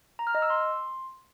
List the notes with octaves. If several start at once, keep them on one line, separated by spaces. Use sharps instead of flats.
A#5
F6
D#5
E6
C6